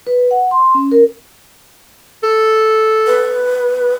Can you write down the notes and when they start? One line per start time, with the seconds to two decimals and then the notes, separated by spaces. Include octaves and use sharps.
0.07 B4
0.31 F#5
0.51 C6
0.75 C#4
0.92 A#4
2.23 A4
3.07 B4